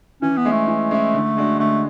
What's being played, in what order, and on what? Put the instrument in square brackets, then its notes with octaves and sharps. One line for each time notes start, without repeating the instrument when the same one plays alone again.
[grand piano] E3 [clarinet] C#4
[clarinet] B3
[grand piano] G#3 C#4 E4
[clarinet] A3
[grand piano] E3
G#3 C#4 E4
D3
G#3 D4 F#4
[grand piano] D3 [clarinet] A3